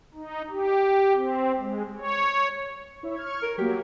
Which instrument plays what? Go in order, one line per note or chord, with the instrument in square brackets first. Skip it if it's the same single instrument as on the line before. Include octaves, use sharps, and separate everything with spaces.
[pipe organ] D#4
G4
C4
G#3
C#5
[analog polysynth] E4 C#5 E5
C#6 F6 G#6
[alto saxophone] A#4
[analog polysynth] F#3 A#3 [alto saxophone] G4